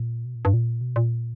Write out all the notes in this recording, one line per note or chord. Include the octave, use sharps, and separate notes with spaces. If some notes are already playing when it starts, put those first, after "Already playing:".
Already playing: A#2
B2
A#2
G2
A#2
B2
A#2